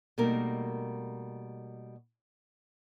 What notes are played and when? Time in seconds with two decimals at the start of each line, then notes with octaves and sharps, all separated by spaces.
0.18 B2 G3 A3 A#3 D#4 A#4